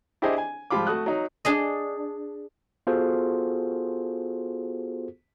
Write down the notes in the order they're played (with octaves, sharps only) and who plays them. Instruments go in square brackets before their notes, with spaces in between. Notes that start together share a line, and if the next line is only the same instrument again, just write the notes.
[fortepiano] D4 E4 G4 G#4 C5 D#5
G#5
G#2 F3 G3 F4 B5 D6
A3 F#4 D#6 F#6
F#3 D#4
[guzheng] D4 G#4 D#5
[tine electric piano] B3 F4 F#4 G#4 A4 C5